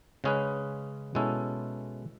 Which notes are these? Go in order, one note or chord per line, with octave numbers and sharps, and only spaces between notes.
C#3 G#3 C#4 G#4 B4
B2 G#3 C#4 E4 A4